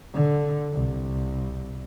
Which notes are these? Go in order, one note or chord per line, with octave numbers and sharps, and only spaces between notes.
D3
C2